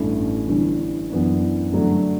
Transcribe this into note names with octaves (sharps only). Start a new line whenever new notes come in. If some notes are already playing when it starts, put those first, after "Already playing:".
Already playing: A1 G2 E3 A3
G1 G2 E3
F#2 E3 B3 D4
G2 D3 F#3 A3 D4